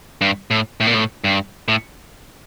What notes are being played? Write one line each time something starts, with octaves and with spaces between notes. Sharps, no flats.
G2
A2
A2
A#2
A2
G2
A2